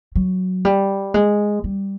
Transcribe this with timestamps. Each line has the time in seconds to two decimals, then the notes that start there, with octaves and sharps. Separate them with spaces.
0.15 F#3
0.65 G3
1.14 G#3
1.64 G3